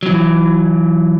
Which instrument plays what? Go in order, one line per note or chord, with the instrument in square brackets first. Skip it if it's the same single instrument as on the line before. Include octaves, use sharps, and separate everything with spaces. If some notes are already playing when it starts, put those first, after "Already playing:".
[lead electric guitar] E3 F#3